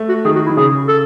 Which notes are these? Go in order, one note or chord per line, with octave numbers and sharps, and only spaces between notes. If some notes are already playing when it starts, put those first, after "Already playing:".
Already playing: A3
F#4
D#3 G#4
F#4
E4
D#3
C#3 G#4
A4